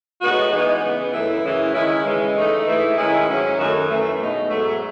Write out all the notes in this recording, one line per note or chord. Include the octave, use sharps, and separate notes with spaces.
A2 G#3 B3 D#4 F#4
E3 G#3 B3 D#4
C#3 E3 B3
F#2 E3 A3 E4
F#2 C#3 E3
D#3 G#3 C#4 E4
C#3 E3 G#3
E3 A3 D#4
G#2 E3 A3 E4
D#3 G#3 C#4 E4
G#2 F#3 C#4
F#2 D#3 A3 D#4 F#4
F#2 E3 A3 C#4
B2 G#3 D#4
G#2 F#3 A3